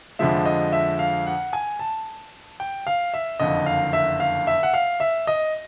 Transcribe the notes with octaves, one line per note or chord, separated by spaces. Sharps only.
F2 D3 F3 G#3 E5
D#5
E5
F5
F#5
G#5
A5
G5
F5
E5
F#1 F2 D3 D#5
F5
E5
F5
E5
F#5
F5
E5
D#5